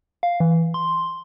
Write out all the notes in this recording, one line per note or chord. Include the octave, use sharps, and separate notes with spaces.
F5
E3
C6